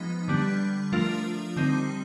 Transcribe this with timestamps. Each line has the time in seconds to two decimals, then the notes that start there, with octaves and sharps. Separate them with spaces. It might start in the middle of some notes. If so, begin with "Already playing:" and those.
Already playing: F3 G#3 B3 D#4
0.28 D3 G3 B3 D4
0.92 F3 A3 D4 F4 A#4
1.56 D3 G3 C4 D#4